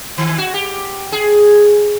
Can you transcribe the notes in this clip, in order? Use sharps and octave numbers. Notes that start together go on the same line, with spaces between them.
D#3
F#4
G4
G#4